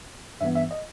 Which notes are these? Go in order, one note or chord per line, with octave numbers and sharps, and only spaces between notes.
G2 E3 B3 E5
E5
D#5